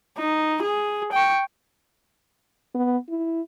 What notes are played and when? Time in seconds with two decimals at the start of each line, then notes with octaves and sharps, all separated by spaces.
0.18 D#4
0.62 G#4
1.12 G5 C#6
2.75 B3
3.09 E4